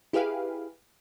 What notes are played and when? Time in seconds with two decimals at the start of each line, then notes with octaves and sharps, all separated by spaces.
0.13 E4 G4 G#4 B4 F5